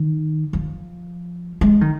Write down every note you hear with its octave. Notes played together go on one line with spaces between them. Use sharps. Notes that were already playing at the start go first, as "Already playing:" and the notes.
Already playing: D#3
F3
G#3
D#3